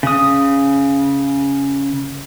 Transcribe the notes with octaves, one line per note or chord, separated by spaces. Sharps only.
C#3 D#6